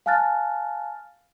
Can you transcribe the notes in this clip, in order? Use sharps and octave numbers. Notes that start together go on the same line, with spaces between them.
F5 G#5 A5 F6 F#6 A6